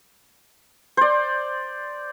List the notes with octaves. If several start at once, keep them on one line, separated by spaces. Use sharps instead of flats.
C5 D5